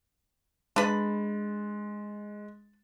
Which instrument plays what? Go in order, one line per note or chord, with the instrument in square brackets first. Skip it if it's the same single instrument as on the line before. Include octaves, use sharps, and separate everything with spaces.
[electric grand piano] G#3 A6 [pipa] D4 B4 B5